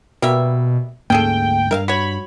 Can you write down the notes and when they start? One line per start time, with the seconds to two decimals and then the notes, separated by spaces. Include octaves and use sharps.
0.22 B2 G3 A#3 E5
1.10 D2 G#2 A#3 C#4 G#4 A4 G5
1.71 G2 A#4 E5 F5
1.88 F#4 C#5 B5